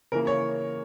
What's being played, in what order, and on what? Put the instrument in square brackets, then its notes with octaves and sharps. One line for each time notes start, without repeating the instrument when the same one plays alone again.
[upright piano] C#3 E3 A#3 A#4
C#5